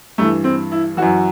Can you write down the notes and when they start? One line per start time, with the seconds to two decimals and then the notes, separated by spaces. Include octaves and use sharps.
0.18 G2 E3 A3
0.44 C4
0.72 E4
0.97 F#2 E3 F#4